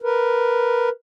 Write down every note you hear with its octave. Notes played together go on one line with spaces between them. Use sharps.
A#4 B4